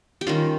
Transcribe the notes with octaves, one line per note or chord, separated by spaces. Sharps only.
G4
D#3 G3 C#4 F4